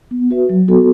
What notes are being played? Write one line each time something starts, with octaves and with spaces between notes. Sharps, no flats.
B3
F#4 B4 E5
F#3
B3 F#4 A4